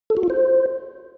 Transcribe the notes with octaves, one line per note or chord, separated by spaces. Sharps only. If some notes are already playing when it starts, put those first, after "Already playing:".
A4
F#4
F4
C5